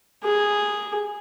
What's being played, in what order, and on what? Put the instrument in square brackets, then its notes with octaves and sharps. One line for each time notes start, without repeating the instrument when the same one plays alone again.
[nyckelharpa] G#4